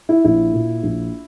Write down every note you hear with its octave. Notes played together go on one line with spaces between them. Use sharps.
E4
A#1 E4
A#2
A#1